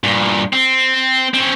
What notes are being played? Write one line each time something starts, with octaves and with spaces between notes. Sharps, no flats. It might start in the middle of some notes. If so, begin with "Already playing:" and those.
G2 A#2
C4
C4 C#4